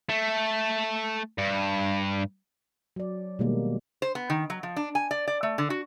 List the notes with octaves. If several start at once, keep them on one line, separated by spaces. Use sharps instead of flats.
A3
G2
F#3 D5
B2 D#3 G3 G#3 A#3
C5
B3
D#3
F#3
F3
D4
G#5
D5
D5
A3
D3
F#4